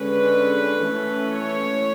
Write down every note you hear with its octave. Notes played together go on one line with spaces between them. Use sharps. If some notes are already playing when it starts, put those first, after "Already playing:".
Already playing: D3 G#3 C#4 B4
E3 A3 C#4
C#5